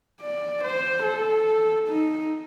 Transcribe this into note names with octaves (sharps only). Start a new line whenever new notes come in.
D5
C5
A4
D#4